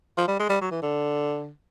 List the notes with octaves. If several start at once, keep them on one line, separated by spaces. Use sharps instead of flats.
F3
G3
G#3
G3
F#3
E3
D3